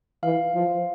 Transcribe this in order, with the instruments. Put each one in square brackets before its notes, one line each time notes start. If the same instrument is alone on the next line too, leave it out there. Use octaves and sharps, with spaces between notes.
[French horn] E3 [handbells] F5
[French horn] F3